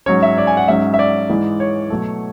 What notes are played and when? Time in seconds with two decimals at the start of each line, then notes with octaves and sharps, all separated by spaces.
0.06 G#2 F#3 C#4 C#5
0.23 E5
0.38 D5
0.47 G#5
0.57 F#5
0.68 G#2 F#3 C#4 E5
0.94 E5
0.99 D5
1.30 G#2 E3 G#3
1.60 C#5
1.90 B2 F#3 A3